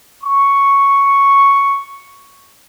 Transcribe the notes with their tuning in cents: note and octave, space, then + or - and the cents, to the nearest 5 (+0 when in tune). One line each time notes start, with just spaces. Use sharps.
C#6 +0